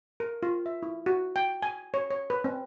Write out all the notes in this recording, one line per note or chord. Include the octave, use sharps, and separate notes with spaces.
A#4
F4
E5
E4
F#4
G5
G#5
C#5
C#5
B4
C4